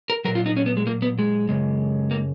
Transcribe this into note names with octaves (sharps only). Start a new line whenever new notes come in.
A#4
A#2 F#3 A#4
F4
D#4
C#4
B3
G#3
A#3
B3
G#3
F#2 C#3 G#3
A#3